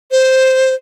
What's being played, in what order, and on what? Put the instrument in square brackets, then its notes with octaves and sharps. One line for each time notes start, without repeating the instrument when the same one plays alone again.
[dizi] C5